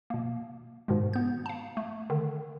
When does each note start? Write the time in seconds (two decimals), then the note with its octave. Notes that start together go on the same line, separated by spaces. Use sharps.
0.10 B2 A#3
0.88 G#2 B2 D#3 G#3
1.13 B3 G6
1.46 F5 A5
1.77 A3
2.10 D3 D#3